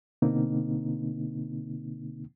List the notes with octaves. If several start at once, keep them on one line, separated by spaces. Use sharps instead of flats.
B2 D3 A#3 C4 D#4